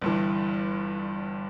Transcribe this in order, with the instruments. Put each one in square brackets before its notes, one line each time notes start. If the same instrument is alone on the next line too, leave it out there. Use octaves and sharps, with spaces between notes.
[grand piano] G1 G2 E3